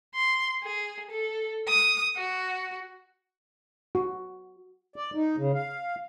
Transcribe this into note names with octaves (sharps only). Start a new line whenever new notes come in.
C6
G#4
A4
D#6
F#4
F#4
D5
D#4
C#3
F5